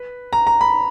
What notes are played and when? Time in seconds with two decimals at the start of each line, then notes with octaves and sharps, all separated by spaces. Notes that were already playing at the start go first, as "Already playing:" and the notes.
Already playing: B4
0.33 A#5
0.47 A#5
0.61 B5